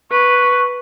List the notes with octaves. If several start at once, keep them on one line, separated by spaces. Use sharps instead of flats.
B4 C#6